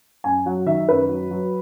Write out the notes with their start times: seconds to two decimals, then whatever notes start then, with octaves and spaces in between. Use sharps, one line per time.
0.24 F#2 G#5
0.46 F#3 F#5
0.66 D#3 E5
0.89 F#2 B4
1.09 F#3
1.31 F#3